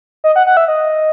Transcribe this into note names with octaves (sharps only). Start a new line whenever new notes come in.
D#5
F#5
F#5
E5
D#5